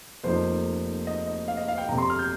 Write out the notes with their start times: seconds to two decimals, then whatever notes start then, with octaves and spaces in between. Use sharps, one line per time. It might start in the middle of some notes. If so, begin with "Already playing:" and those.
0.24 F1 F2 F3 A#3 D#4 C5
1.07 D#5
1.27 D#5
1.48 F5
1.57 D#5
1.68 F5
1.78 G5
1.88 G1 F2 C3 A#5
1.98 C6
2.10 F6
2.19 G6